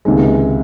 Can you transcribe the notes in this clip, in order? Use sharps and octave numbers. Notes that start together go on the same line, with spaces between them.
C#2 C3 D#3 G#3